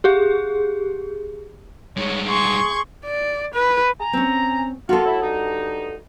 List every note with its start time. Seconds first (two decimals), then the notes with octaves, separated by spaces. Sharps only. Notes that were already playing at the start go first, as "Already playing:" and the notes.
0.04 G4 G#4
1.97 G2 G#3 C#5
2.28 G#4 C6 C#6 G#6
3.05 D5
3.54 B4
4.00 G#5 A#5
4.13 C4 C#4
4.89 A#3 F4 F#4 A4
5.05 A2 E4
5.22 G2 D#4